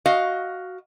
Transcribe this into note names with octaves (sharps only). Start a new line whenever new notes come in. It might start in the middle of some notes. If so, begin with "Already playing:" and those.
F#4 D#5 F5